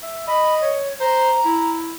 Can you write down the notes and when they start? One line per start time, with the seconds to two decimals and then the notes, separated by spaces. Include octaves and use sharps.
0.03 E5
0.27 D#5 B5
0.61 C#5
1.00 C5 A#5
1.45 E4